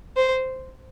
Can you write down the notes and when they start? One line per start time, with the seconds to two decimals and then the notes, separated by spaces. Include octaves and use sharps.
0.16 C5